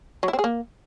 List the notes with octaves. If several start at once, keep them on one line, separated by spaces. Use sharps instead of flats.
F#3
E4
C4
G#4
A#3